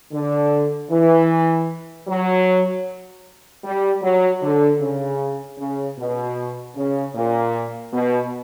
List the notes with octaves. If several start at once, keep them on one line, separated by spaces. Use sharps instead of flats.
D3
E3
F#3
G3
F#3
D3
C#3
C#3
B2
C#3
A#2
B2